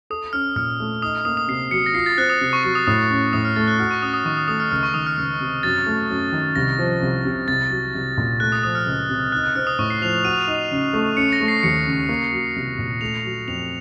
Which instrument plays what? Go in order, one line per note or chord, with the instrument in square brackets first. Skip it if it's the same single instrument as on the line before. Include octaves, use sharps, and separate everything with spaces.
[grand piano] A4 [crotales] D#6
[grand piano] C#4 [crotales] F6
[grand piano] A#2 [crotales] F6
[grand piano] A3
[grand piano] D#4 [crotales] D#6
[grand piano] A#3 [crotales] D#6
[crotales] D#6
[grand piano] C3 [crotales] C7
[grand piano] F#3 [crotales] C#7
[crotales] A#6
[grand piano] F4 [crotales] C7
[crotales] A6
[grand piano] C4 [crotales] F#6
[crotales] D#6
[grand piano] C3
[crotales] C#6
[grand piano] F#3 [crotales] C#6
[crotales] D#6
[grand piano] A2 [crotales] D#6
[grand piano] C#4
[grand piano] A2 [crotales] D#6
[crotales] F6
[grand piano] A3 [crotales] A6
[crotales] F#6
[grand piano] F#4 [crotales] F6
[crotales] C#6
[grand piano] C#4 [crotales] D#6
[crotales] D#6
[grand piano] D#3 [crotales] C#6
[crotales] D#6
[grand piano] A3 [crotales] D#6
[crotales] F6
[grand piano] C#2 [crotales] F6
[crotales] C#6
[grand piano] D#3 [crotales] D#6
[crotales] F6
[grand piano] C#2 [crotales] F6
[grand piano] C3
[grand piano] F#2 [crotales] A6
[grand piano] A3
F#2
D#3
[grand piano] C2 [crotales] A#6
[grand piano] F3
C2
C3
[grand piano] C2 [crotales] A6
[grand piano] F#3
C2
A#2
[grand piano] A3 [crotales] F#6
[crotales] D#6
[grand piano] F3 [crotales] D#6
[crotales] F6
[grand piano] C#2
C3
[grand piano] D#4 [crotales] F#6
[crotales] F#6
[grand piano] C4 [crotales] F6
[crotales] D#6
[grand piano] A2 [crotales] C#6
[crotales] C7
[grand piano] F3 [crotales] F7
[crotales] F7
[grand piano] F#4 [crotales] D#7
[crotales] F7
D#7
[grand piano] D#4
C#3
A3
[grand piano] C#4 [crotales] C#7
[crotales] A#6
[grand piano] A3
[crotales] C7
[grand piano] D#2 [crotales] C#7
[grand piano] C#3
A#3
F#3
C2
A#2
[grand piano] A3 [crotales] F7
[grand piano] F#3
[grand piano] F2 [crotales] F7